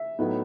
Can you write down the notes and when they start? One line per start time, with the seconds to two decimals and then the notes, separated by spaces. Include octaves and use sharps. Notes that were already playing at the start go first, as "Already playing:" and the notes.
Already playing: E5
0.19 A2 F#3 B3 D#4